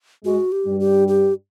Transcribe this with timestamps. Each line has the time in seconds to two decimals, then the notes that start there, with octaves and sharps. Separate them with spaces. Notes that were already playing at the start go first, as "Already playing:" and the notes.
0.24 G#2 G#3 F#4
0.52 G4
0.66 G2 G3
0.80 G4
1.08 G4